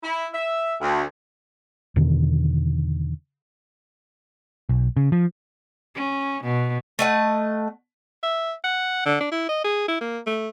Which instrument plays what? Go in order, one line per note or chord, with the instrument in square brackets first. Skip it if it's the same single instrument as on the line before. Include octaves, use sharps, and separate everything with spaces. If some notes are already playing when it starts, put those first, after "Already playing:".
[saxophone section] E4
E5
D2
[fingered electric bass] E2 B2 D3 D#3
[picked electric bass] B1
C#3
F3
[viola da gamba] C#4
B2
[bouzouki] A3 D#5 F#5
[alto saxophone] E5
F#5
D3
D4
E4
D#5
G#4
E4
A#3
A3